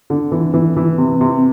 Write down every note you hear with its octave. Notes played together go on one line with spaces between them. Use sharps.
D3
E3
E3
E3
C3
C3